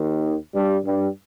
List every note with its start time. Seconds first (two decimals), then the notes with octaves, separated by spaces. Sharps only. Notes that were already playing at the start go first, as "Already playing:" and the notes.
Already playing: D#2 D#3
0.55 G2 G3
0.86 G2 G3